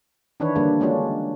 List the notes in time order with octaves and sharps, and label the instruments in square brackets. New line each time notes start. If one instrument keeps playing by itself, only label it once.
[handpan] D#3 E3 D4 E4 B4 C#5
D3 G3 A#3 D4
G#3 A#3 C#4 D4 F4 F#4